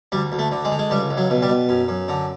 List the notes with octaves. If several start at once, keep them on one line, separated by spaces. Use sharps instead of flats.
D2 G3
D2
A3
D3
G#3
D3
G#3
C#2 G3
C#2
F#3
B2
G3
B2
F#2
F#2
D3